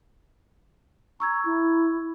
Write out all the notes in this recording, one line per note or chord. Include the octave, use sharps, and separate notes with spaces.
A#5 C#6 E6 G#6
E4